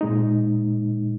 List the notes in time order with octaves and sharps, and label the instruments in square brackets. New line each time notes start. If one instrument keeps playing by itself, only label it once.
[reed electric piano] A#2 G#3 D#4